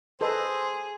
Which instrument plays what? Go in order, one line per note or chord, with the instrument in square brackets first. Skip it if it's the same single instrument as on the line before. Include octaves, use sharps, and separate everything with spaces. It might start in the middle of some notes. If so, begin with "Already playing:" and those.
[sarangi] G#4 [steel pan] A4 B4 D#5 [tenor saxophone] C5